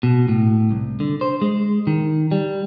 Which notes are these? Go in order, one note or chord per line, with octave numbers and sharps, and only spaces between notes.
B2
A2
C2
D3
C5
G#3
D#3
G3